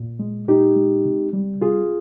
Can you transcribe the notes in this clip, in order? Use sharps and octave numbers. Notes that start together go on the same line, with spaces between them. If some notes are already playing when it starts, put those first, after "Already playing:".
Already playing: A#2
G#3
A#2 D#4 G4
G#3
C3
G3
C3 F4 G#4